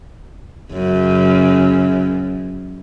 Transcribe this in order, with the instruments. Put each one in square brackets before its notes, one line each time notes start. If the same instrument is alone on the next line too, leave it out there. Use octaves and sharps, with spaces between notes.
[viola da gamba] F#2 C#3